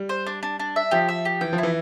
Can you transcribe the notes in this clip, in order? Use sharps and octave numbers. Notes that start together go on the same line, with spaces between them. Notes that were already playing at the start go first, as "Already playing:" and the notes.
Already playing: G3
C5
D4
D4
D4
E5
F3 G4
E5
G4
E3 G5
F3
E4
E3